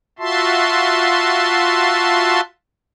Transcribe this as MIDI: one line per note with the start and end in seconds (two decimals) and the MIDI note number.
0.19 2.41 65
0.19 2.41 66
0.19 2.41 76
0.19 2.41 81
0.19 2.41 84